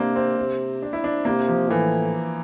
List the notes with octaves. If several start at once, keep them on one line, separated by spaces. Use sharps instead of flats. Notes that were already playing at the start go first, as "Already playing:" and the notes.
Already playing: C3 A#3 C4 D4
C4
C3
D4
E4
D4
C3 A#3
F3
A2 E3